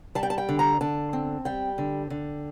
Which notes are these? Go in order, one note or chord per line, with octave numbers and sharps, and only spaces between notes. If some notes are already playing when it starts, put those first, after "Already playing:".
G3 A5
G5
A5
G5
D3
A#5
D3 A5
C4
G3 G5
D3
D3